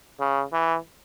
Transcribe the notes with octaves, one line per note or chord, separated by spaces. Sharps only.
C#3
E3